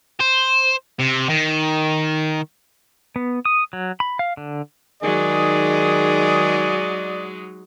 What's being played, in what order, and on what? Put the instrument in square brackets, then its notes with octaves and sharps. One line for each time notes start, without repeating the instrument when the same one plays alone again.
[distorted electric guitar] C5
C3
D#3
[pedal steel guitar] B3
D#6
F#3
B5
F5
D3
[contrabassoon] D#3 [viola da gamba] F#3 G#3 D#4 [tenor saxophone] G#4 [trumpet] D5